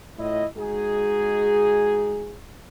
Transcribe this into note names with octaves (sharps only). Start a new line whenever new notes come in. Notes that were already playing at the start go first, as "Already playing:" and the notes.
A2 E4 F4 D#5
G#3 D#4 F#4 G#4